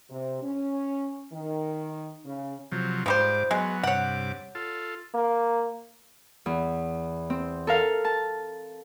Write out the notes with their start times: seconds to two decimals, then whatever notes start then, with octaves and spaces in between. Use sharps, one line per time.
0.10 C3
0.42 C#4
1.32 D#3
2.24 C#3
2.72 C3 F3 F#3
3.06 G#2 F3 G3 C5 D6
3.51 F#3 G#3 B3
3.83 G2 C3 C#5 F#5 D6
4.55 F4 A4
5.15 A#3
6.46 E2
7.30 C4
7.67 A4 A#4 F5
8.05 A5